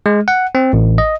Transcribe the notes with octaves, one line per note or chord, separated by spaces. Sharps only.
G#3
F#5
C4
A1
D#5